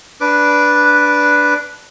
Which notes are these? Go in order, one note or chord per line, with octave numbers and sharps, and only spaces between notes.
D4 B4 D6